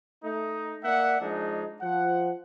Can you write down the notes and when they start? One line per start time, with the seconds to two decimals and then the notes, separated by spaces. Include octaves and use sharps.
0.24 A3 D#4
0.84 A#3 D5 E5 F#5
1.21 F3 G#3 D4 D#4 G#4
1.82 F3 F#5